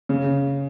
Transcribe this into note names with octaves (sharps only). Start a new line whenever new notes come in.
C#3